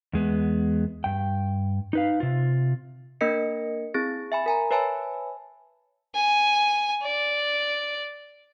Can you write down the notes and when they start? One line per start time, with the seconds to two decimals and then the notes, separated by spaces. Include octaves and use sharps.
0.13 E2 G#3 B3
1.04 G2 G5
1.93 D#4 B4 F5
2.20 C3 F4
3.21 A#3 D4 A#4 D#5 A#6 C#7
3.94 C4 E4 G#4 A6
4.32 E5 G#5 B5
4.46 A#4 G#5 A#5
4.71 B4 C#5 E5 G#5 A5 B5
6.15 G#5
7.03 D5